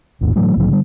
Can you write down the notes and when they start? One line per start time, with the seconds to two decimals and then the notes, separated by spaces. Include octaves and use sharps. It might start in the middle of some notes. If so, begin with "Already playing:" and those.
0.21 G#1 D#2 A2
0.36 A2 E3 F#3 A3
0.57 C2 A2 D#3 F#3
0.69 D3 G3